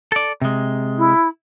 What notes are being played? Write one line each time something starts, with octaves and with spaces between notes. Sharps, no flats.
A4 D5
C3 G#3
E4